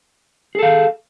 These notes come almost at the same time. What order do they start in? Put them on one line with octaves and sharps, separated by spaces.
G#4 A4 F5